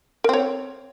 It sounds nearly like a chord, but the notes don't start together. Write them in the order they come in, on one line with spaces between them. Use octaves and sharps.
A#4 C4 C#5